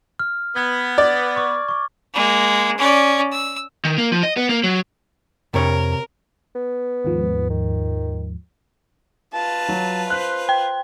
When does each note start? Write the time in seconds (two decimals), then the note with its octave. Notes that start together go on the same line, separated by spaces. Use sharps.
0.19 F6
0.56 B3 G#6
0.98 D5
1.36 C#6 D6
1.68 C#6 D6
2.14 G#3 A#3
2.77 C#4 D5
3.32 E6
3.85 D#3
3.98 A#3
4.12 F3
4.23 D#5
4.37 B3
4.49 A#3
4.63 F#3
5.54 F2 C3 A#4 C#5
6.55 B3
7.05 D#2 G#2 F3
7.50 D#3
9.34 F4 B4 A5
9.69 F#3
10.10 C5 F#6 B6
10.49 G5